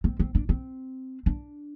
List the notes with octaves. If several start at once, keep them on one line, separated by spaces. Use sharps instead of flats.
C4
C4
D4
C4
D4